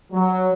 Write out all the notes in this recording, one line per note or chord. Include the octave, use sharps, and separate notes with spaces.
F#3